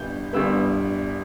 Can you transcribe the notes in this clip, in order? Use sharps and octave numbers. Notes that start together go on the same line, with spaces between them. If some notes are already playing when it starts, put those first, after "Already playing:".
Already playing: G1 G3 B3 G6
G1 G2 G3 B3 E6